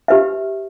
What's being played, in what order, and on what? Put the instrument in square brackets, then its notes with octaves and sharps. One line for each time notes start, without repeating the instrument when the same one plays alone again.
[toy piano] G4 B4 E5